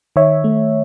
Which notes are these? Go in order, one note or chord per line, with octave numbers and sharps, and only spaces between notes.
D#3 C#5 E5
A3